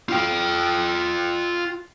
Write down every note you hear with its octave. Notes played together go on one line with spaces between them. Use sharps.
F4 G5